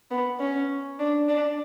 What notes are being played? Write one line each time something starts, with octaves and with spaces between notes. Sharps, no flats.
B3
C#4
D4
D4